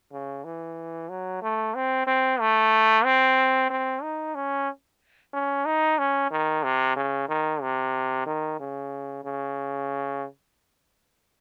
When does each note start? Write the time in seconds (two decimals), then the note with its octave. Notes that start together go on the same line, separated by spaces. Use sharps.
0.12 C#3
0.44 E3
1.09 F#3
1.42 A3
1.75 C4
2.07 C4
2.40 A3
3.05 C4
3.70 C4
4.02 D#4
4.35 C#4
5.33 C#4
5.66 D#4
5.98 C#4
6.31 D#3
6.63 C3
6.96 C#3
7.29 D#3
7.62 C3
8.26 D#3
8.60 C#3
9.24 C#3